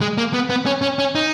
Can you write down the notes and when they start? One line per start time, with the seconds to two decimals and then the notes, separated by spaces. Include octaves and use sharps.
0.01 G#3
0.18 A#3
0.34 B3
0.50 B3
0.66 C#4
0.82 C#4
0.99 C#4
1.15 D#4